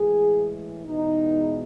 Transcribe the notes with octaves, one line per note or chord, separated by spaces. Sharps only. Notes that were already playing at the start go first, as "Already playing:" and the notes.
Already playing: A2 E3 G#3 G#4
E2 B2 G#3 B3 D#4